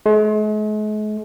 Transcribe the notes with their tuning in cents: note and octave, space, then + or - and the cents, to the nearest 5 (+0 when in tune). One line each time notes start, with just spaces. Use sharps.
G#3 +45